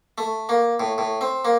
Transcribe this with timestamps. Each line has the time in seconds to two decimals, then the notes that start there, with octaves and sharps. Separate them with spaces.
0.18 A3
0.49 A#3
0.80 A2
0.98 A2
1.21 C4
1.45 A#3